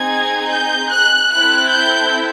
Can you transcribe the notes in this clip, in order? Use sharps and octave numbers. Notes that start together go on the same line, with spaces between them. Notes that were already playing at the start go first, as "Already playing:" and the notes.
Already playing: C4 D#4 G#4 G#6
G6
F#6
C4 E4 A4 F#6
G6